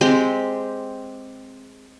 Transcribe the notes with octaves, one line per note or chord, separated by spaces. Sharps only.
G#3 C4 G4